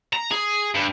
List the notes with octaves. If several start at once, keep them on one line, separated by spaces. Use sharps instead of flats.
A#5
G#4
G2